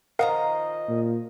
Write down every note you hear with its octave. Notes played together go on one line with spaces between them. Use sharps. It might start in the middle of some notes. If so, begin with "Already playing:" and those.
D#3 F3 A#4 D#5 F5 F#5 A#5
A#2